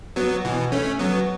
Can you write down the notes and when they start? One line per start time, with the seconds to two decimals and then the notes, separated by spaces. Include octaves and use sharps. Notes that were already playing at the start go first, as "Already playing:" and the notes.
0.16 F#3 B3
0.44 B2 E3
0.72 A3 C#4
0.99 F#3 B3